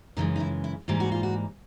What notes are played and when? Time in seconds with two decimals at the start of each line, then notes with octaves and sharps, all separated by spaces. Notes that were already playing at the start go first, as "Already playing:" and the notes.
0.17 F#2 C#3 E3 G#3 D#4
0.36 D#4
0.40 E4
0.64 E4
0.88 G#2 E3 G3 A#3 G4
1.00 F#4
1.12 F4
1.23 F#4